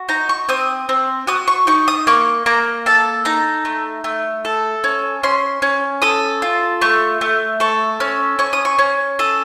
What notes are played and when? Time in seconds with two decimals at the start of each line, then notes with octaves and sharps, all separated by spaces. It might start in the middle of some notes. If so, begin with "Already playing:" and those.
Already playing: F#4
0.09 D#4 A#5
0.29 C#6
0.49 C4 D#6
0.89 C4
1.27 F#4 D#6
1.48 C#6
1.67 D#4 C#6
1.88 D#6
2.07 A#3 C#6
2.46 A#3 A#5
2.86 A4 A5
3.25 D#4 A#5
3.65 A3
4.04 A3
4.45 A4
4.84 C#4
5.23 C#4 C6
5.62 C#4
6.02 A4 D#6
6.42 F4
6.81 A3 C#6
7.21 A3
7.60 A4 C#6
8.00 C#4
8.39 C#4 C#6
8.53 D#6
8.65 C#6
8.79 C#4
9.19 A4 D#6